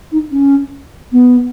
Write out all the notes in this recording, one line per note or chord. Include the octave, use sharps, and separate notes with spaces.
D#4
C#4
B3